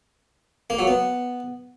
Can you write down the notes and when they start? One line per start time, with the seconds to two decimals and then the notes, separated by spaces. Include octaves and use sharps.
0.70 A#3
0.79 F#3
0.87 B3